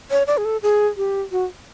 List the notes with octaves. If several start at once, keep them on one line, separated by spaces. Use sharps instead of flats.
C#5
D5
G#4
A4
G#4
G4
F#4